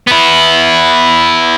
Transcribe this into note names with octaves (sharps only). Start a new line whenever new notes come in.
B3 E4